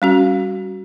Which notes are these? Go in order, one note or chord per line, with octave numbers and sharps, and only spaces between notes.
G3 C#4 F#4